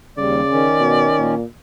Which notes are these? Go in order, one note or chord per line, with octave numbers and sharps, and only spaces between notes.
D#2 C#3 G3 D5
D#3 C#4
B2
A#2